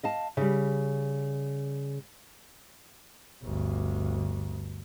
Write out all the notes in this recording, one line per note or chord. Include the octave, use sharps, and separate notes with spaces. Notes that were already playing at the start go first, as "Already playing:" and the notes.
D#5 F5 A5
C#3 G3
G1 D2